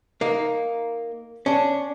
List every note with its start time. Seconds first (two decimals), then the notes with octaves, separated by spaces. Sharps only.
0.21 A#3 D#4
1.46 C#4 D4